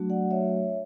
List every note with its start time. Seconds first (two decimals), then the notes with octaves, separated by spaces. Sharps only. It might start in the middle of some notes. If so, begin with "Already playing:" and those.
Already playing: F#3 A3 D4 F#4
0.10 D5 F#5
0.31 C#5 E5